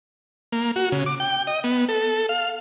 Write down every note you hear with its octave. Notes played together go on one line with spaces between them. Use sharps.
A#3
F#4
C#3
D6
G5
D#5
B3
A4
F5